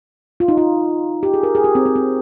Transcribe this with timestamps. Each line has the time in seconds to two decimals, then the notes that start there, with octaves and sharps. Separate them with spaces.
0.40 F4
0.48 D#4
0.58 F4
1.23 G4
1.34 G#4
1.43 A#4
1.55 G#4
1.64 G4
1.75 C4
1.86 C4
1.96 C4